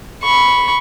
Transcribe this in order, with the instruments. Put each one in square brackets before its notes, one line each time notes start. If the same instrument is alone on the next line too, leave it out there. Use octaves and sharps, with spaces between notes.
[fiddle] B5 C#6